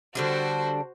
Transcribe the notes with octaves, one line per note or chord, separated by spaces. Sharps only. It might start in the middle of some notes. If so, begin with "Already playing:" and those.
D3 G3 D4 F#4 C5